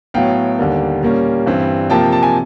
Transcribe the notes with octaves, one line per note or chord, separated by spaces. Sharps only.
A2 F#3 B3 F5 G5
D#2 D3 G3 A#3
A#2 G3 A#3 C#4
G2 E3 G3 C4
C3 F3 A#3 G5 A5
A5
G#5